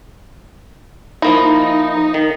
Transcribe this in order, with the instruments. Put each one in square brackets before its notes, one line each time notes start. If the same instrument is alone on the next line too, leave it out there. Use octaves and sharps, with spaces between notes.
[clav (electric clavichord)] F3 A#3 E4 [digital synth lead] D#4
[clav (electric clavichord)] D#3